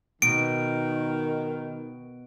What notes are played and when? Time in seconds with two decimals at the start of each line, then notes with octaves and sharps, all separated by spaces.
0.22 B2 D#3 D7